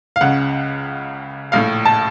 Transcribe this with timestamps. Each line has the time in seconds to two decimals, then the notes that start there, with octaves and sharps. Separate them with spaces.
0.16 F5
0.21 C#2 C#3 F#5
1.52 A#1 A2 F5
1.85 A5